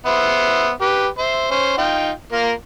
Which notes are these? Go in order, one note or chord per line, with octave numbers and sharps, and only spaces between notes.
B3 C5 E5
G4 B4
C5 E5
C#4 C5
D#4 F4 G5
A#3 F4 A#4